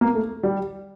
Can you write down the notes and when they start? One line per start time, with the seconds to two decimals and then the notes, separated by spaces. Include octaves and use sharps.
0.01 A#3
0.15 A3
0.43 G3